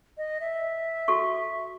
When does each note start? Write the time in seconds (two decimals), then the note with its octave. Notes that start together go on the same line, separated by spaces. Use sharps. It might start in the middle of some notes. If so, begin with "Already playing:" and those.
0.18 D#5
0.41 E5
1.08 F#4 A4 C#6